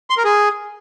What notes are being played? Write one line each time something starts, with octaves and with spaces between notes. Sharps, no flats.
C6
A#4
G#4